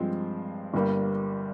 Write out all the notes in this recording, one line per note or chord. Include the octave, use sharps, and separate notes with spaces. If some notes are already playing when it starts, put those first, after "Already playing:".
Already playing: G2 F3 G#3 C4
G1 G2 G3 A#3